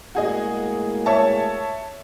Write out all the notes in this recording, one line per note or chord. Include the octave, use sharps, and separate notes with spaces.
A2 G#3 A#3 F#4 G#4 D#5
C#5 E5 A5